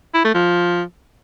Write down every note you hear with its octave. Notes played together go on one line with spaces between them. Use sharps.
E4
A3
F3